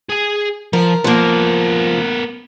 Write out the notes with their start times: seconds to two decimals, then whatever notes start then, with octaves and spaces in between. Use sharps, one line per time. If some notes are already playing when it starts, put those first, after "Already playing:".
0.10 G#4 G#5
0.73 F3 A#4
1.04 F3 A#3 B3 A#4